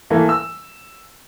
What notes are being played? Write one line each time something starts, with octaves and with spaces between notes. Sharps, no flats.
E3 A3 A#3
E6